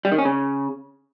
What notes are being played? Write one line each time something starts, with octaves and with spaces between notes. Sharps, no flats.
G3
D#3
C#4
C#3